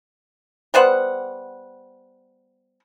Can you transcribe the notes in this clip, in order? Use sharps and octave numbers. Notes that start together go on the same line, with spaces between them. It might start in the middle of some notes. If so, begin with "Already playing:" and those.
G3 B3 C5 F#5